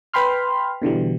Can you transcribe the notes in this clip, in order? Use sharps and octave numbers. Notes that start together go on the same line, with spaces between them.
B4 G5 B5 C6 F6
B2 D3 E3 G3